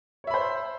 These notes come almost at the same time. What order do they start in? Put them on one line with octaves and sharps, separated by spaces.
C#5 E5 B5 C5